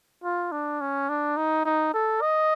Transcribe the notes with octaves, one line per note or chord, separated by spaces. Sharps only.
F4
D4
C#4
D4
D#4
D#4
A4
D#5